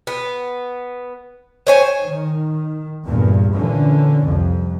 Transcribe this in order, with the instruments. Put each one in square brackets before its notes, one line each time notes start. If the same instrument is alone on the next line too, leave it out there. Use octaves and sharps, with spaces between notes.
[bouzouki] B3
C5 C#5 G#5
[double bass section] D#3
E2 G2 A#2
A#2 D3 E3 C#4
C2 F2